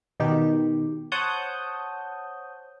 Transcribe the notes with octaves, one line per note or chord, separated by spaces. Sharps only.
B2 D#3 G4
C5 C#5 F#5 A5 D#6 G6